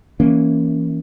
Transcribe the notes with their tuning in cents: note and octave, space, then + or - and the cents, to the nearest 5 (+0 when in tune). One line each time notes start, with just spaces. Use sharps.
E3 +0 A#3 +0 C#4 +0